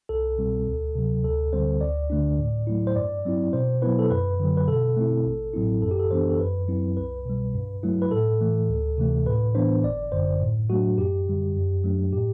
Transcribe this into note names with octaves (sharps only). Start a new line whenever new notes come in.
C2 A4
B2 G3 C4
D2
C3 F#3
D2 A4
D3 G3 C4 C5
D2 D5
D3 A3 D4
A2
F#3 A3 E4
C5
G2 D5
F#3 C4 E4
B2 C5
F#3 B3 E4 B4
A4
F#2 B4
D3 F#3
B4
B2 A4
A3 C4 E4
A1
A2 F#3 C4 E4
F#2 A4
G4
A4
E3 B3 D4 C5
A4
F#2 B4
F#3 C4 E4
C2 B4
B2 G3
G2
F#3 A3 E4
B4
A2 A4
E3 A3
D2
C3 E3 A3
A2 B4
E3 B3 D4 C5
G1 D5
F#2 D3 C5
A2
F#3 A3 D4 F#4
F#2 G4
D3 G3
F#2
F#3 A3 D4
A2 G4